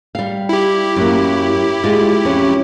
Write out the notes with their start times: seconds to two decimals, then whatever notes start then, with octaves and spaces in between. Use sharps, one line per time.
0.15 G3 F5
0.49 E4 G4
0.96 F#2 A#3
1.84 G#3 F4
2.25 F2 C#4